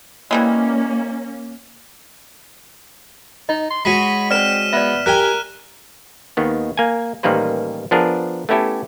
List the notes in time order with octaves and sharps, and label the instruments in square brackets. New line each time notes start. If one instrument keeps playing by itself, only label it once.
[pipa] E3 G3 G#3 [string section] A#3 C#4
[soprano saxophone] D#4 [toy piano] D#5
[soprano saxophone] C6
[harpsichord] G#3 F#4 C#5 [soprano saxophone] B5 [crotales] B6 D#7
[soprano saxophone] C4 [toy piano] C5 D5 [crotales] F6 E7
[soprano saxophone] B3 [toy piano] D5 E5
[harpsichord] G4 G5 G#5 [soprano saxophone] A#4 [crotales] F#6
[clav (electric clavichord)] D#2 D#3 B3
A#3 G#5
A1 D#3 G3 A#3 B4 C5
F3 B3 D4 G#4 A#4
A3 B3 C#4 E4 G4 A4